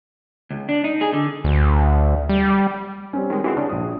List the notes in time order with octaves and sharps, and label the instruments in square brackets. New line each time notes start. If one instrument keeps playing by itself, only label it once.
[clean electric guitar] C#2
D4
D#4
G#4
D3
[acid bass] D2
G3
[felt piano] G3 C4 C#4
[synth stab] D#3 G#3
[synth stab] E3 G#3 C4 [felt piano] F#4
[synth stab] C#3 [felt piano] D4
[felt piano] A#1 D#6